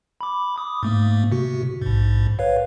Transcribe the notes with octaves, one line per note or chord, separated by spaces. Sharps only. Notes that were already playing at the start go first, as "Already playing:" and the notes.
B5 D6
D6 D#6
G#2 A3 A#3
C3 F#4
A#1 G#2
B4 C#5 F5